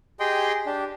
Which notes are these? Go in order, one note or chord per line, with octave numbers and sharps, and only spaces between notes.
G4 G#4 D#5 G5 C6
D4 G4